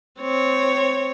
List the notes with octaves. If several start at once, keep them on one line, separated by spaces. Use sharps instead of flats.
C4 C#5